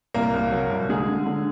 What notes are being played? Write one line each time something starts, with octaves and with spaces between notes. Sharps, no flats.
C2 A#3 A#4
C2
F#3
C2
D3 G#3 G#4
D3
D3